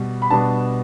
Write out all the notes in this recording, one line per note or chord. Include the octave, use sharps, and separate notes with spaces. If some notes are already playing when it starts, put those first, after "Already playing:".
Already playing: B2 G3
B5
B2 G3 B3 D4 A5